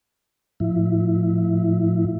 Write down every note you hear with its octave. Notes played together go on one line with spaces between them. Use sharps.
A2 F3 E4